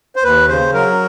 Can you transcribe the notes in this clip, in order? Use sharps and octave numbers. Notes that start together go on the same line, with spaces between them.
C5
D#2 B4
C#3 C5
F#3 A#4